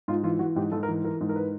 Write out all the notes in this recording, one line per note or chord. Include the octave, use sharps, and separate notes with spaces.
G#2 F4
E3 F4
E3 F#4
G#2 G4
G#2 A4
A#4
E3
E3 A#4
G#2
A#4
B4